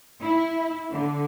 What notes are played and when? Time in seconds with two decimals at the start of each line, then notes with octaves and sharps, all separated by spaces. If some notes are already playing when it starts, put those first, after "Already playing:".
0.22 E4
0.91 D3